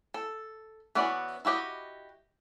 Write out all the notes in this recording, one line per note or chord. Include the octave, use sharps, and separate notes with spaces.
A4
E3 B3 C#4 F#4 D5
E4 F#4 G4 D#5